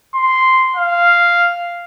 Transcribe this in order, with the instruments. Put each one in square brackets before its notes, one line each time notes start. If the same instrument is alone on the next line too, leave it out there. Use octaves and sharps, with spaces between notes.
[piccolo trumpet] C6
F5